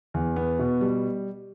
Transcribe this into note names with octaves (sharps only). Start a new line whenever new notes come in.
E2
B3
B2
G3